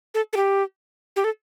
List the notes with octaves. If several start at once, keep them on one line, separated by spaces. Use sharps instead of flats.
A4
A4
G4
G4
A4